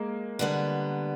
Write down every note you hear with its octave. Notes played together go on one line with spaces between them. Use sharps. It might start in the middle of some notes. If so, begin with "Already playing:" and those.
Already playing: G#3 A#3
D3 G3 B3